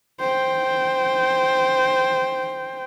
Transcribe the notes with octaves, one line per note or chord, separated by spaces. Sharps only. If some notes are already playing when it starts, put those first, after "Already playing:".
C5 G5